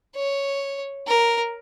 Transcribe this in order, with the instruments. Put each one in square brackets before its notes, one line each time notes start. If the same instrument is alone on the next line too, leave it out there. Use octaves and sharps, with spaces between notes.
[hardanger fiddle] C#5
A#4